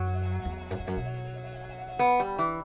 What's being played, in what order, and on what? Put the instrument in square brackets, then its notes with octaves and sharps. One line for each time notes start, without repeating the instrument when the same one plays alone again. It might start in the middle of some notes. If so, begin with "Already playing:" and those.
Already playing: [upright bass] F#2 [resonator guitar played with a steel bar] F#3
[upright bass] E2
F#2
E2
F#2
B2
[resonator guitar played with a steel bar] B3
G3
E3